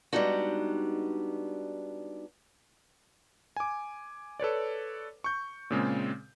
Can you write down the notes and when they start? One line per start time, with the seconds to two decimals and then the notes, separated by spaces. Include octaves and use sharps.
0.13 G3 G#3 B3 D4 D#4 F#4
3.56 G#5 D6
4.40 A4 B4 C#5 D5
5.24 C#6 G6
5.70 A#2 C#3 G#3 C4